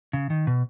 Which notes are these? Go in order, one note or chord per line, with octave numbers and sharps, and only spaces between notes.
C#3
D#3
B2